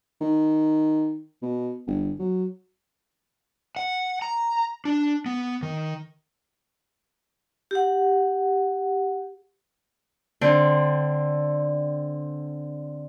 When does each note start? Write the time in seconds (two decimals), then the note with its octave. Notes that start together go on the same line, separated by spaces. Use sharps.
0.21 D#3
1.42 B2
1.87 G1
2.19 F#3
3.76 F#5
4.22 A#5
4.85 D4
5.26 B3
5.62 D#3
7.71 G4 F#5
10.41 D3 C4